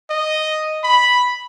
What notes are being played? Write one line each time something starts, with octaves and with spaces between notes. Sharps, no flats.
D#5
B5